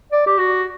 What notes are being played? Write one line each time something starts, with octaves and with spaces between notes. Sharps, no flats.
D5
G4
F#4